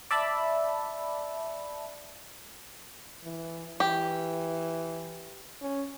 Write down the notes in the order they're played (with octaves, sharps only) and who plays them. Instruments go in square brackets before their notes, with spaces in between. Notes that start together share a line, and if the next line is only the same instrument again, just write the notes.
[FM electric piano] D5 E5 A5 B5
[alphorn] E3
[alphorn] E3 [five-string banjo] G4
[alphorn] C#4